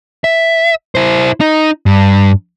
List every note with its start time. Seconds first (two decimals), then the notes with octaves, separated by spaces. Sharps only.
0.24 E5
0.95 E4 C5
1.40 D#4
1.86 G2